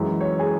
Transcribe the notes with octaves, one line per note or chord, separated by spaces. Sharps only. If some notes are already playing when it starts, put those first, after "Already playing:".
Already playing: F#2 E3 G#3
C#5
G#4